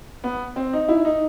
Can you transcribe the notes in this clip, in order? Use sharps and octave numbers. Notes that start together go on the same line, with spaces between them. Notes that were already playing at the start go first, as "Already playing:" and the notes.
B3
C4
D#4
E4
D#4